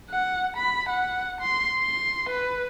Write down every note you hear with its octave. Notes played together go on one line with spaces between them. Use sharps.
F#5
B5
F#5
C6
C6
B4